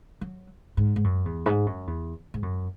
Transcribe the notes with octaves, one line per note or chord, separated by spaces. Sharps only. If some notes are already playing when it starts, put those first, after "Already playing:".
F#3
G#2
G#2
F#2
E2
G#2
F#2
E2
G#2
F#2